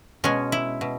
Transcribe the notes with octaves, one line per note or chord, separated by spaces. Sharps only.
B2 G#3 C#4
E4
B2